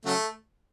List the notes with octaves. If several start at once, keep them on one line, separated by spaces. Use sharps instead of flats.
C#3 F#3 A3